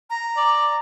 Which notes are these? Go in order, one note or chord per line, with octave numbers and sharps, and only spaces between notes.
A#5
D5